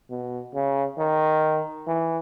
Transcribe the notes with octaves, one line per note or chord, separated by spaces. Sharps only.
B2
C#3
D#3
E3